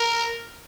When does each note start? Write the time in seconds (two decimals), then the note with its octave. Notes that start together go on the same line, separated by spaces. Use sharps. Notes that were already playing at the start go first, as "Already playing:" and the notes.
Already playing: A#4